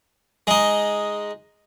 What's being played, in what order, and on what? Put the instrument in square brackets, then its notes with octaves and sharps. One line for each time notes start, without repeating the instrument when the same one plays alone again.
[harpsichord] G#3 D#4